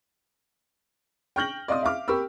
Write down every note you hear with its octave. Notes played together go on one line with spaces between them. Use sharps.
G5 C#6 F6 G6 A#6 F#7
D5 D#5 F5 C6 D6 D#6
E5 F5 D6 F6
G4 A#4 B5 C#6 E6